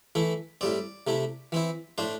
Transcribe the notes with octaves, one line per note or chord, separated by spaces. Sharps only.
E3 A3 E4
A2 G3 C4 D5
C3 A3 E4
E3 C4 E4
A2 A3 D4 C5